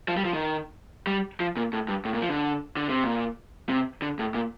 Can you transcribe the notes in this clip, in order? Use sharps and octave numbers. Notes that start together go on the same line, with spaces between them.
F3
G3
F3
D#3
G3
F3
A#2
A2
G2
A2
A#2
F3
D3
D3
C3
A#2
C3
D3
A2
A#2